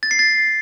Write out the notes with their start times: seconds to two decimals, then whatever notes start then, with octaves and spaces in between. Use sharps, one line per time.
0.03 A6
0.11 C7
0.19 A6